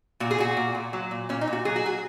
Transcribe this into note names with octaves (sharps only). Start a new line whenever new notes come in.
A#2 F#4
G#4
A#2 F#4
A#2
A#2
F#3
A#2
A#2 C#4
D#4
A#2
F#4
F#3 G#4
F#4
F#3 G#4